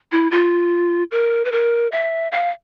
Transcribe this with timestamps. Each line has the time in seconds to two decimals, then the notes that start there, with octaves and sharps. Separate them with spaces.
0.12 E4
0.31 F4
1.11 A#4
1.45 B4
1.52 A#4
1.92 E5
2.32 F5